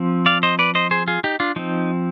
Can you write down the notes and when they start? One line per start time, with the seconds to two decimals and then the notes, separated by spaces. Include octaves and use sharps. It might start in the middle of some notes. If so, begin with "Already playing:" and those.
Already playing: F3 C4
0.26 D5 F5
0.43 C5 D#5
0.59 B4 D5
0.75 C5 D#5
0.91 G#4 C5
1.08 F4 G#4
1.24 D#4 G4
1.40 D4 F4
1.56 F3 C4 D#4